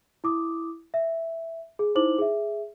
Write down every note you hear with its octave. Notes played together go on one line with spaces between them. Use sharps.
E4 D6 D#6
E5
G#4
D#4 E4 C5 D6 F#7
G#4 E5